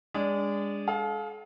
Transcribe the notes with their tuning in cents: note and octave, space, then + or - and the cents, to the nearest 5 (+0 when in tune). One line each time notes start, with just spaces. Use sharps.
G#3 -25 D4 -20
A4 -45 F5 +20